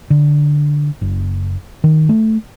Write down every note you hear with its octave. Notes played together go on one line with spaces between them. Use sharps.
D3
F#1
D#3
A3